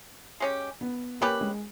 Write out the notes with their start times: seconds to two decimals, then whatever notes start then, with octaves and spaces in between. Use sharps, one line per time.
0.40 G#3 C#4 G4
0.81 B3
1.21 G3 A#3 C#4 G4 B4
1.41 G#3